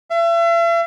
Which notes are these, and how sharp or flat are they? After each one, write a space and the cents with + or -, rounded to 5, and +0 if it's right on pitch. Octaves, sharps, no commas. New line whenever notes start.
E5 +40